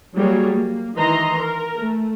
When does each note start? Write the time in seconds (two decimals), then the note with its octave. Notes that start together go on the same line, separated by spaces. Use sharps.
0.15 F#3 G3 A#3 F#4 G#4 C#5
0.55 A#3
0.96 D#3 E3 D#5 A#5 C6
1.41 A#4
1.76 A3